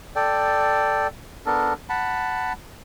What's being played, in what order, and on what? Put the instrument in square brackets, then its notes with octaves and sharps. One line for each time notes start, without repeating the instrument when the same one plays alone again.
[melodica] A4 D5 G5
B3 D4 A4 A#4
F#5 A5 B5